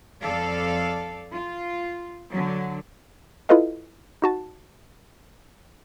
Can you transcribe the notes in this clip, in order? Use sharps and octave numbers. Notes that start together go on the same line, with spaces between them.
F2 A4 D5 F5
F4
D3 F#3
E4 F4 A4 B4 D#5 F5
D#4 F#4 A5